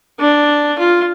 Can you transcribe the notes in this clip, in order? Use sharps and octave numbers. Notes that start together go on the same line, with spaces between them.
D4
F4